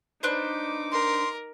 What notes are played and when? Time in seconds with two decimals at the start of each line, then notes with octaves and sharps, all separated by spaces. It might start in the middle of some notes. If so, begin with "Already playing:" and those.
0.23 D4 D#4 B4 C5 D6
0.92 A#4 C6